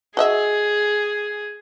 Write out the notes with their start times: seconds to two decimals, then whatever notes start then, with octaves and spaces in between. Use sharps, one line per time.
0.17 F#4 G#4 D#5 E5